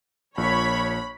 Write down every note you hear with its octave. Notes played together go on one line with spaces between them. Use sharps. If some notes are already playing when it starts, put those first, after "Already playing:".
A#1 A#2 C#5 B5